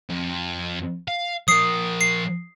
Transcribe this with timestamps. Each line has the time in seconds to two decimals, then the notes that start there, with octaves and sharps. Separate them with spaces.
0.10 F2
1.08 F5
1.48 F3 A#4 D#6 C7
2.01 C7